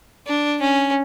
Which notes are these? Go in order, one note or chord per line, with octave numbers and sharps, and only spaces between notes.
D4
C#4